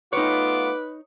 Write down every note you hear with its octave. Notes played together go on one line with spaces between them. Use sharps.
A3 B3 D#4 F4 B4 C#5 D6